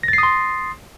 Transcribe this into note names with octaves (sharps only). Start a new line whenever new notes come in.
C6 D#6 A6 A#6 C7